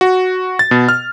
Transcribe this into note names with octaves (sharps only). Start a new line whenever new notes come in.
F#4
A6
B2
F6